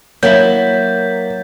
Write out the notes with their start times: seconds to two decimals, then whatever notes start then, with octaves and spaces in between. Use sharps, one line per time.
0.23 F#3 A#3 E4 C#5 G6 A6 B6